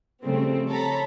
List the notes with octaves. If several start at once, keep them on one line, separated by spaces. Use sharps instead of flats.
C#3 F3 G3 A3 C4
A4 C#5 A#5 B5